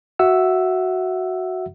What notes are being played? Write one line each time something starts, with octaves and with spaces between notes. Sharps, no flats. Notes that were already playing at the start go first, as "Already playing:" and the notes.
F#4 E5 F#5 E6